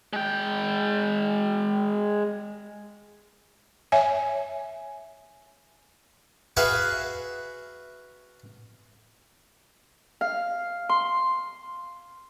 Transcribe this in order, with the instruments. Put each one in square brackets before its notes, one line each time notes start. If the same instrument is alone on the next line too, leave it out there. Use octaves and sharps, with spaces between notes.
[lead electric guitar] G#3 G5
[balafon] C#5 E5 G#5
[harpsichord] F#4 G#4 B4 E5 F5
[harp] F5
C6